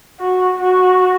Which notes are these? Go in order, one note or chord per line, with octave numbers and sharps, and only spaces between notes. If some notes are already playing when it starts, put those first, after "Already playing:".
F#4
F#4